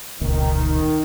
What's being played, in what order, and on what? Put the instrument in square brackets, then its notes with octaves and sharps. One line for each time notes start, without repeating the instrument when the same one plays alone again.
[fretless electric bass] E1 C#2 A#2 [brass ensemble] D#3